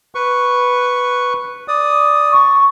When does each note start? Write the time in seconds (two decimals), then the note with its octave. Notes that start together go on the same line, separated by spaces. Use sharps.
0.15 B4 C#6
1.68 D5 D#6
2.32 C#6